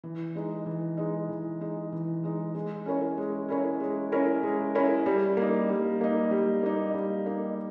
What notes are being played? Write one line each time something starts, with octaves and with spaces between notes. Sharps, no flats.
E3
G#3 D#4
E3
G#3 D#4
E3
G#3 D#4
E3
G#3 D#4
G#3
C#4 E4 A#4 C#5
G#3
C#4 E4 A#4 C#5
G#3
C#4 E4 A#4 C#5
G#3
C#4 E4 A#4 C#5
G3
A#3 D#4
G3
A#3 D#4
G3
A#3 D#4
G3
A#3 D#4